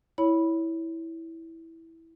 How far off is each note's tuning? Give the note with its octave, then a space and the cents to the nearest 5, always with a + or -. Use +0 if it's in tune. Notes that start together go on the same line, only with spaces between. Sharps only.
E4 -10 C#5 +15 B5 -10